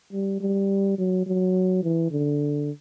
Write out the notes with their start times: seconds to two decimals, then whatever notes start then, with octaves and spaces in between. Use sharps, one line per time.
0.13 G3
0.40 G3
0.98 F#3
1.26 F#3
1.83 E3
2.11 D3